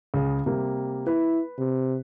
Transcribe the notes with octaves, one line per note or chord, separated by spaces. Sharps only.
C#2 G#4
C3 G3 A#3
E4 B4
C3